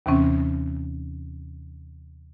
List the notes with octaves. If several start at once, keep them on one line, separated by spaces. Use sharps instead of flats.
D#2 C3 E3 C4 C#4